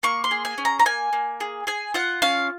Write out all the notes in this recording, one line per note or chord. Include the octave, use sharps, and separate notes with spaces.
A#3 C#6
C6
G#4
G#5
C#4
A#5
A#5
A#3 G#5
A#3
G#4
G#4 G#5
F4 F#5
C#4 F5